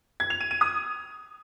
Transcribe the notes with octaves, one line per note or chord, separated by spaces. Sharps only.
G#6
F7
D#7
D#7
D#6